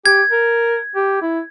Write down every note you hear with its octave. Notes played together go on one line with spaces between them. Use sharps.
G4 G#6
A#4
G4
E4